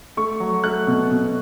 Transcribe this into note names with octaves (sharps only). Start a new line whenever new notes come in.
A3 C#6
F#3
A3 F#6
B2
B2